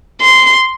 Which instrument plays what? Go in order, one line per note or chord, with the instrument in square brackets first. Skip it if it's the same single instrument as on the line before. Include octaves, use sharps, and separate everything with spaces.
[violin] C6